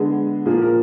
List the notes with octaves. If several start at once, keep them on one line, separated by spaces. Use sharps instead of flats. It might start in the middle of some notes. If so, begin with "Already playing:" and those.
Already playing: D3 G#3 B3 G#4
A#2 F3 A#3 G#4
A#4